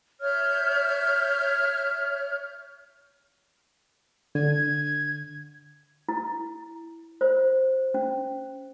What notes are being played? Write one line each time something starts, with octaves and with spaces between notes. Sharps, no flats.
C#5 E5 F6 G6
D3 G#6
E4
C5
C#4